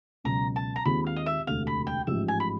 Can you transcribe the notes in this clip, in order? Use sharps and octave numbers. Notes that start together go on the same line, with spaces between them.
C#2 B2 F#3 A#5
A5
A#5
D#2 D#3 G#3 C4 F4 B5
F5
D#5
E5
E1 D2 C3 F5
B5
G5
A1 G#2 F3 E5
G#5
B5